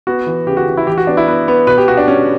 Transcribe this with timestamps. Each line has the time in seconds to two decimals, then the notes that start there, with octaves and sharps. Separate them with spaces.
0.07 B3 F#4
0.27 E3
0.47 C#3 G4
0.57 F#4
0.67 E3
0.77 E4
0.87 E3 G4
0.98 F#4
1.07 B3 D4
1.17 E4
1.28 B3 B4
1.48 B3
1.67 B2 B4
1.78 G4
1.88 B2 F#4
1.97 D4
2.08 G3 C#4